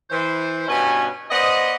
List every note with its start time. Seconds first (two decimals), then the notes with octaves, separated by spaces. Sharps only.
0.10 E3 C5
0.69 G2 B2 C#4 B4 G#5
1.31 B3 C5 D5 D#5